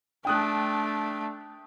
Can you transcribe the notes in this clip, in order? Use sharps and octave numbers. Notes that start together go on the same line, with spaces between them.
A3 D4 G5 D#6 F#6